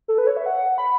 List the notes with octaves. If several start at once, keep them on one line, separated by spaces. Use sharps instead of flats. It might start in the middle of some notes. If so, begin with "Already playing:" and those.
A4
B4
C#5
E5
F#5
B5